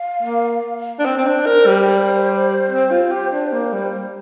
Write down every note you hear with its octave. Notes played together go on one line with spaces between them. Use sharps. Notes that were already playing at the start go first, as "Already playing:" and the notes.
Already playing: F5
A#3
D4
C4 C5
C4
D4
A#4
G3
C4
F4
G4
D4
A#3
G3